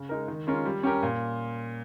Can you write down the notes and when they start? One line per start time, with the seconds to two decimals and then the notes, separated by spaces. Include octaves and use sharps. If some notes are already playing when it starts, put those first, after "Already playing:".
Already playing: C#3
0.09 G#3 D#4 A#4
0.28 D#3
0.47 G#3 C#4 F4 A#4
0.66 G3
0.83 C#4 G4 A#4
1.03 A#2